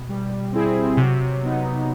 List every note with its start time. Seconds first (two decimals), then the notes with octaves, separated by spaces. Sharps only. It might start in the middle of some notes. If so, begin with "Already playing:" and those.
Already playing: B2
0.09 G3
0.52 C4 E4 G#4
0.97 C3 F#3
1.43 B3 D#4